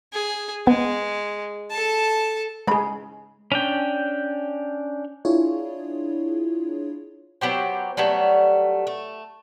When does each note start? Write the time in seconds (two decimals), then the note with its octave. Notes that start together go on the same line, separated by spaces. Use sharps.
0.13 G#4
0.67 G#3 B3
1.71 A4 A5
2.67 E3 G#3 C#4 G#4 B5
3.52 C#4 D4 G5
5.25 D4 E4 F4 G#4 C#5
7.41 F#3 B3 G4 C5
7.97 F#3 G3 A3 B3
8.87 A3